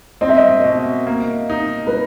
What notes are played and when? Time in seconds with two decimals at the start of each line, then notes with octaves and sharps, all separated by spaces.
0.21 C4 D#5
0.29 E5
0.37 D#5
0.64 B2
1.07 A#3
1.50 D#4
1.87 B4